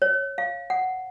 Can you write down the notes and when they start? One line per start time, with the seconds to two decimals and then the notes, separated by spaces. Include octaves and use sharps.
0.02 C#5
0.38 F5
0.70 F#5